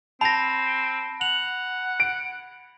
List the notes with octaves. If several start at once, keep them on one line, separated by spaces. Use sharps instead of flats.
C4 A5 B5 A#6
F#5 F7 F#7
D7